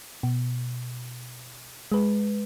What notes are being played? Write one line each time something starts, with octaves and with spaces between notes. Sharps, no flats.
B2
G#3 B4